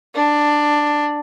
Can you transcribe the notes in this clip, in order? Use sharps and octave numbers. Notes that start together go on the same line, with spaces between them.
D4